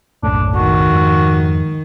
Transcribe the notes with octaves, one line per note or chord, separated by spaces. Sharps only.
F#1 B1 A2 D4
D#3 F#4
F2 G#2